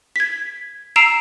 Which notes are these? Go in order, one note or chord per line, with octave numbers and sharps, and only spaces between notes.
G#6 B6
A#5 E6 C7 D7 E7 F7